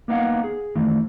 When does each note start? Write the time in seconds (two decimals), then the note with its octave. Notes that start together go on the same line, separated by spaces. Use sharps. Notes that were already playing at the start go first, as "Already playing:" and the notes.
0.08 A#3 B3 D#4 F5 F#5
0.44 G#4
0.75 D#3 E3 A3